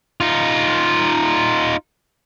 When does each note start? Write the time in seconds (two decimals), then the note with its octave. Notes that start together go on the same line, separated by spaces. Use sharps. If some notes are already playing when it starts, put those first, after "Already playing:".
0.20 D#4 F4